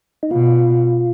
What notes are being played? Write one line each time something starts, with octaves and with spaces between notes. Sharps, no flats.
D#4
B2 F4